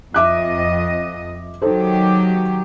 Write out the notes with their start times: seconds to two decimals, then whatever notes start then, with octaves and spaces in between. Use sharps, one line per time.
0.14 F2 D#5 E5 D6 F#6
1.62 D#3 F#3 D#4 G4 A4 C5